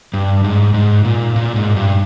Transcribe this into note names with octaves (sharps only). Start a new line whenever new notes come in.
G2
G#2
G#2
A#2
A#2
G#2
G2